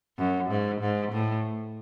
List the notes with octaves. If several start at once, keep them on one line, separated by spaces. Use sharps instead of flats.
F#2
G#2
G#2
A2